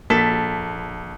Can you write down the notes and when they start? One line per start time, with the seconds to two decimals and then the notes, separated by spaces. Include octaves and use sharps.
0.10 A#1 A#3 A4 B6